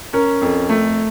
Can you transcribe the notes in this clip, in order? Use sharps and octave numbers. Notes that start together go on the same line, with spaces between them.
C#4 A#4
F2
A3